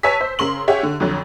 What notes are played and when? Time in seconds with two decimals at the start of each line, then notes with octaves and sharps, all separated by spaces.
0.03 B4 C#5 G#5 A5 E6 B6
0.21 C5
0.39 C#3 A#4 C6 F#7
0.68 G4 G#4 C#5 E5 F#5 G5
0.83 D3
1.00 F2 D3 F#3